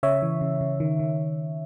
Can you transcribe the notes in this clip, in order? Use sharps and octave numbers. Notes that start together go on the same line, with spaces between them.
C#3 C#5 E5
E3
C#3
C#3
D#3
D#3